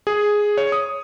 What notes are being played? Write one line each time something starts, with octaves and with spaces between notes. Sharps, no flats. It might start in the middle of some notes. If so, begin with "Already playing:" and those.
G#4
C#5
D#6